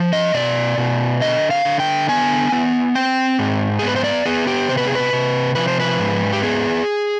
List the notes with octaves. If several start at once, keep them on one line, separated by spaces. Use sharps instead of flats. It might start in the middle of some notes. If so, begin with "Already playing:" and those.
Already playing: F3
D#5
B2 D5
B2
D3 D#5
F5
D3
G5
B3 G#5
B3
C4 G5
G#2
B3 G#4
B4
C5
D5
B3 G#4
G4
C3 C5
B4
G#4
B4
C3
F3 B4
C5
B4
G#2
G4
B3 G#4